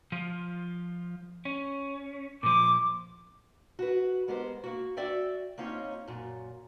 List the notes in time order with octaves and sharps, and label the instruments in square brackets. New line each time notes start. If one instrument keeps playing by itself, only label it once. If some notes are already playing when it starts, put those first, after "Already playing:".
[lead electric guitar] F3 F4
C#4
[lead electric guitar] A#2 F3 [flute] D6
[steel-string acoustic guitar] F#4 B4
G#3 B3 G4 A#4 C5
A#3 F#4
F#4 D5 E5 G5
A#3 C4 C#4 D#4 F4 C#5
F#2 A#2